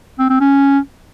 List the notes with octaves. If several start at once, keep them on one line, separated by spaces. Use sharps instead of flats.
C4
C4
C#4